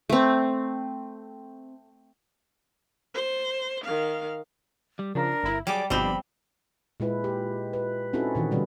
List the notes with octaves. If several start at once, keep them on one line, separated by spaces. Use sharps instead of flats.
A3 C4
C5
D#3 F5
G3
C#3 F3 D4 A#4
G1 E4
F#3 G3 G#4 D5 D6
G1 B2 F3 G3 C4 D4 G4 B5
A#2 G#3 E4 B4
G4
B4
C4 C#4 D#4 E4 F#4 A4
A#2 D#3 E3
B2 D3 G3 C#4 F4 B4